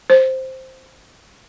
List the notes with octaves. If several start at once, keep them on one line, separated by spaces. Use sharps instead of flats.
C5